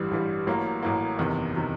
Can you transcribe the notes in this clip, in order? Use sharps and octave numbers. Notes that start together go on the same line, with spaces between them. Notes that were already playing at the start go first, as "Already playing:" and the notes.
Already playing: A1 G2 E3 G3
A1 G2 E3 G3
A1 A2 F#3 A#3
A1 A2 F#3 A#3
F#1 E2 C3 D#3
C3 D#3